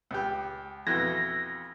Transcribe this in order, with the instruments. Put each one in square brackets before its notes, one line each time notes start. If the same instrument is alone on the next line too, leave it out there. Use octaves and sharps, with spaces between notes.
[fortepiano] C#2 G4
[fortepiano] F2 B2 E3 [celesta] G#6 [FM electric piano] A#6